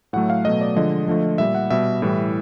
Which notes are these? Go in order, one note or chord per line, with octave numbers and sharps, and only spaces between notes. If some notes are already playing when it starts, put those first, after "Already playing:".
A2 F#3 A3 F#5
F5
B2 F#3 A3 D#5
D5
D3 F3 G#3 D#5
D3 F3 A3
A#2 G3 E5
F#5
B2 G3 E5
A2 E3 G3